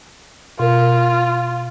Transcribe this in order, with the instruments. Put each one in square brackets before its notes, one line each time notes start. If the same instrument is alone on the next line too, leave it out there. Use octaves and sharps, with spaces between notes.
[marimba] B2 A#4 [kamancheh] F4